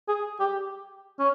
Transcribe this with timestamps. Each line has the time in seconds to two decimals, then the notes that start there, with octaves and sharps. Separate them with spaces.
0.08 G#4
0.40 G4
1.19 C#4